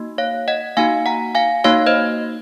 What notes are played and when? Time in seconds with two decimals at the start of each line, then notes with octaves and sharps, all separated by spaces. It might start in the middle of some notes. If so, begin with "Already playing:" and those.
Already playing: A#3 D#4 F#4
0.18 C#5 F5
0.48 D#5 F#5
0.77 A#3 D#4 F#4 F5 G#5
1.06 F#5 A#5
1.35 F5 G#5
1.64 A#3 D#4 F#4 C#5 F5
1.86 C5 D#5